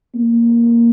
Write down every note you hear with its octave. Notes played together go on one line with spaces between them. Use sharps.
A#3